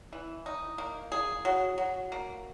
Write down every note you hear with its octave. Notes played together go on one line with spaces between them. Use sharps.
E3
D#4
A#3
G#4
F#3
F#3
A#3